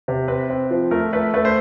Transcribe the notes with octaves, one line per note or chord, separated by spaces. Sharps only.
C3
C4 B4
C4
F3
A3 A#4
A3 B4
A3 B4
C5